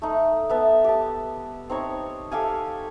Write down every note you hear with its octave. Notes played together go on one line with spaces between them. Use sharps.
A3 D#4
B3 E5 A5
G4 A5
C4 D#4 C#5
G4 A4 F5 G#5